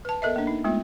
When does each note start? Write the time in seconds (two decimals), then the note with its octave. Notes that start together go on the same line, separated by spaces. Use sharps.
0.05 B4 A5
0.22 B3 A4 A#4 D#5 E5
0.36 A#3 D4
0.47 D#4
0.64 G#3 A3 B3 F4